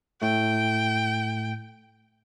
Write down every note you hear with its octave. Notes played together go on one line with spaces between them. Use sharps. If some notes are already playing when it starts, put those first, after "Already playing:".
A2 A3 G5